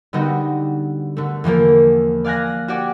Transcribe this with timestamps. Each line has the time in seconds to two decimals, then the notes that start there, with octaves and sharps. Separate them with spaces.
0.13 D3 G3 B3 D#4 F#4
1.17 D3 A3
1.44 E2 E3 F3 A#3
2.24 D5 F5 G#5 F#6 A#6
2.68 F#4 G4 D5 G#5